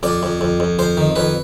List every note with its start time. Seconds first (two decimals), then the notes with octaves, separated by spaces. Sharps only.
0.03 F2 D5
0.23 F2
0.41 F2
0.60 F2
0.79 F2 C5
0.97 D#3
1.16 F2 B4